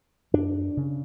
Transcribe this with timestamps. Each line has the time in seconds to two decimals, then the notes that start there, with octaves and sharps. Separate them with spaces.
0.34 F#2 D4
0.77 C#3